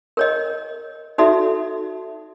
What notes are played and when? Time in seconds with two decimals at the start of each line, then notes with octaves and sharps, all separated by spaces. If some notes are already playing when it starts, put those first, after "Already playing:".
0.17 A#4 C#5 D#5
1.18 D#4 F#4 A4 D5 E5